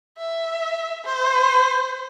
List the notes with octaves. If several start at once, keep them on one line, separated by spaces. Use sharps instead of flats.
E5
C5